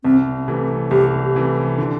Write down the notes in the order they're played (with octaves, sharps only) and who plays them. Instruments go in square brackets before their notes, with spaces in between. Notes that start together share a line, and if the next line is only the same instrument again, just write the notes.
[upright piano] C2 [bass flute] C4
[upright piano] C3 E3 A3
[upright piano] C2 [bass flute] G4
[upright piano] C3 E3 A3
D3